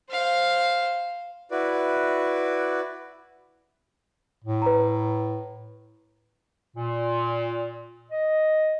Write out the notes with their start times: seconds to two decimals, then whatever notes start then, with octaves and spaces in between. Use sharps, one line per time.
0.10 C5 F5
1.51 E4 F#4 B4 D5
4.44 A2
4.62 B4 A#5
6.76 A#2
8.11 D#5